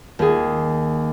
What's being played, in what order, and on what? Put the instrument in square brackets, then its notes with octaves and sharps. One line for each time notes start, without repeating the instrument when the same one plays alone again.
[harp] D#2 G#4